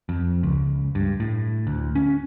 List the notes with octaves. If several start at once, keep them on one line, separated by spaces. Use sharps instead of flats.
F2
C#2
G2
A2
D2
C#4